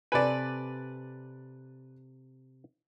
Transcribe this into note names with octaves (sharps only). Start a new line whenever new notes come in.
C3 A4 B4 D5 G#5